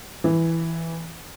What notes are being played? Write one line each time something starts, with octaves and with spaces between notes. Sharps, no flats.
E3